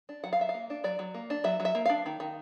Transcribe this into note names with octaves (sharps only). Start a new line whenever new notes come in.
D4
F#3 F#5
F5
F#3 E5
F5
A#3
D4
F#3 D5
F#3
A#3
D4
F#3 E5
F#3
E5
A#3
D4 F5
D#3
D#3